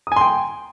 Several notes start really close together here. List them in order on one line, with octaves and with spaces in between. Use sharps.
D#6 G#5 C6 G5